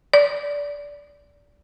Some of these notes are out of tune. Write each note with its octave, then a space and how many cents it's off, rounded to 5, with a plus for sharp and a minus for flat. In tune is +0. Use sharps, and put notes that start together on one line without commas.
D5 -20